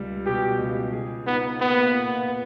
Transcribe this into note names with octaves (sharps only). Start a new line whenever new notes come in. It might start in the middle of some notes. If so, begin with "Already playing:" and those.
Already playing: C#2 G3
B2 G4
C#2
G#4
B3 D#4
A#3 B3
A#2
B3